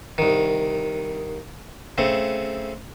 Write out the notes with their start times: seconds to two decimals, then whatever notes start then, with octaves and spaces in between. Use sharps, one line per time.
0.18 C2 D#3
1.98 C#3 A3 C4